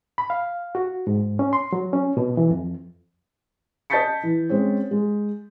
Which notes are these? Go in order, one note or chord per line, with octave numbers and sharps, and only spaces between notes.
B5
F5
F#4
G#2
C#4
C6
F#3
C#4
B2
E3
F2
D#5 A5 G6 A6 B6 C#7
E3
G#3 C4 C#4
G#3